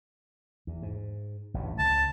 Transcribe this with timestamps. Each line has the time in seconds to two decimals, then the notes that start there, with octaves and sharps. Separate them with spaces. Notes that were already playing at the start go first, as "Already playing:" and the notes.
0.67 E2
0.83 G#2
1.54 A1 D2 G2
1.79 C#2 A5